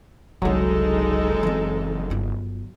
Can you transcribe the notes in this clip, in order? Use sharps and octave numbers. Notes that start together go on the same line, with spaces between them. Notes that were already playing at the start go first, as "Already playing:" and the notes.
F#1 C2 D3 F#3 G#3 D#4 A4
E3 C4
G1 F4